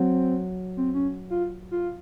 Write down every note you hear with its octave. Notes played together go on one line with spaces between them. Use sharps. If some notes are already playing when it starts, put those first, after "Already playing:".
Already playing: F#3 C4
C4
C#4
F4
F4